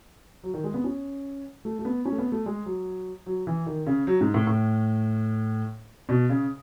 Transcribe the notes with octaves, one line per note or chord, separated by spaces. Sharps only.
F#3
D#3
G#3
B3
C#4
A3
A3
B3
C#4
A3
B3
A3
G#3
F#3
F#3
E3
D#3
C#3
F#3
G#2
A2
A2
B2
C#3